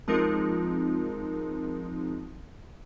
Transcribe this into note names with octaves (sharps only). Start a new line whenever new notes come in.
F3 G#3 C4 D#4 F4 A#4